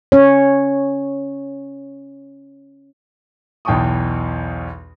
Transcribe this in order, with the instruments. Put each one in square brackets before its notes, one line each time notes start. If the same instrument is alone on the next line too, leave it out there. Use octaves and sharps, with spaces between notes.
[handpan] C#4 C#5
[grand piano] B1 E2 G5 A5 C#6 D#6